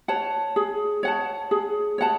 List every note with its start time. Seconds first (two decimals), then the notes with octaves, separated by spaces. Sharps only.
0.08 C#5 F#5 A5
0.56 G#4
1.03 C#5 F#5 A5
1.51 G#4
1.98 C#5 F#5 A5